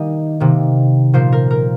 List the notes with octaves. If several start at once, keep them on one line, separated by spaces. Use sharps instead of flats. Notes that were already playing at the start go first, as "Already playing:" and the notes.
Already playing: D#3 G3 A#3 D#4 D#5
C3 D#3 A#3
A#2 F3 A#3 C5
A#4
A#4